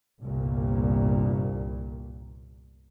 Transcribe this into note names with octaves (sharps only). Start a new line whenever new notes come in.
G1 C2 A#2